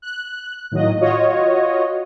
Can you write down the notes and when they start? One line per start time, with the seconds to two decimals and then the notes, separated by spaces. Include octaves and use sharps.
0.02 F#6
0.71 A2 D#3 F#3 A#3 D#5
1.01 F4 F#4 C#5 D#5